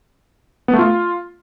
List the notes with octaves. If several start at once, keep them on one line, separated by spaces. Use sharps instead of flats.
B3
A3
F4